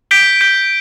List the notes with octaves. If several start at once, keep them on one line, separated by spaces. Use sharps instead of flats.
G6 B6 D7 G7
G6 B6 D7 G7